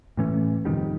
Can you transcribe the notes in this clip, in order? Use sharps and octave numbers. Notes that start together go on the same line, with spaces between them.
A2 E3 A3 C#4
F2 C3 D#3 G3